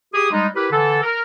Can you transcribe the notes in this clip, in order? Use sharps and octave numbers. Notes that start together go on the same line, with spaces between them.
G4 G#4 D#6
G3 G#3 D#4
E4 G4 A#4 B4
D3 E3 A4
A#4